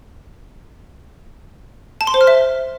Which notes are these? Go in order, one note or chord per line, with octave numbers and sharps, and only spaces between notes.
A5
C6
C5
F6
E5